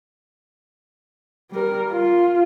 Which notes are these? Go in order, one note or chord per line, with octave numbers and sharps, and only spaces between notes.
G3 A#4
F4